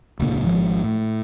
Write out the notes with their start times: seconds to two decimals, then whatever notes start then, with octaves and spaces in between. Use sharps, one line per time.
0.19 E1 C#2 A#2 D3
0.43 G#1 F3 G#3
0.84 A2